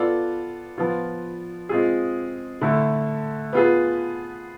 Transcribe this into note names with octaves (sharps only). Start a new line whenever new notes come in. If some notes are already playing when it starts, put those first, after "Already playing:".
Already playing: B3 F4 A4 D5
F3 B3 F4
G#3 C4 F4 G#4
D3 A3 E4 A4
B3 F4 G#4 B4